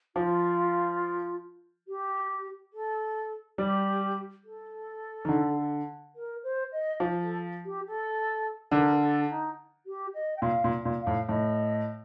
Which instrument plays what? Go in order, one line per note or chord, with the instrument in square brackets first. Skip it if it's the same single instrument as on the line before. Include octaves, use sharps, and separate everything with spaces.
[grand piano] F3 [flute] F4
[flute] G4
A4
[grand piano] G3 [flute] G4
[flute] A4
[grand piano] D#3
D3
[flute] A#4
C5
D#5
[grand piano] F3
[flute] A4
G4
A4
[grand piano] D3 [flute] A#4
[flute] A4
D#4
G4
D#5
G5
[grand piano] A#2 [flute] F5
[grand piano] A#2
A#2
[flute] F5
[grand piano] A2
[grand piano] A2 [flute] D#5